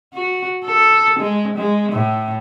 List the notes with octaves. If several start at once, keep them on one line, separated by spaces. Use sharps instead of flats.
F#4
A4
G#3
G#3
A2